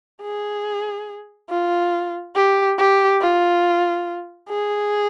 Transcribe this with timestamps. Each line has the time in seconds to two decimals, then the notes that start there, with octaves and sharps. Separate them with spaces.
0.22 G#4
1.50 F4
2.35 G4
2.78 G4
3.21 F4
4.49 G#4